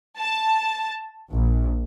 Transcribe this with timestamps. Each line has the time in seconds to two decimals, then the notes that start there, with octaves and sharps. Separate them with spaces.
0.19 A5
1.32 A#1